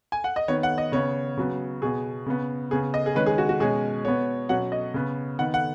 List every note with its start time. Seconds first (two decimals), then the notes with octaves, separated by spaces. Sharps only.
0.12 G#5
0.24 F#5
0.36 D#5
0.48 D#3 B3 C#5
0.63 F#5
0.78 D#5
0.92 C#3 B3 C#5
1.37 C#3 F#3 B3
1.82 B2 B3 G#4
2.26 C#3 B3
2.71 C#3 B3 G#4
2.94 D#5
3.06 G#4
3.15 D#3 G#3 C#4 B4
3.26 G#4
3.38 F#4
3.49 F#4
3.60 B2 G#3 C#4 G#4
4.05 B2 B3 C#5
4.49 B2 F#3 C#4 F#5
4.72 D#5
4.94 C#3 B3
5.39 D#3 B3 F#5
5.54 F#5